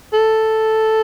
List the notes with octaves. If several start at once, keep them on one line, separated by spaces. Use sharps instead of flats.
A4